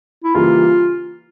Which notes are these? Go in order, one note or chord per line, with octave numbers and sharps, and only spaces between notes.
E4
C#3 E3 G3 A#3 F4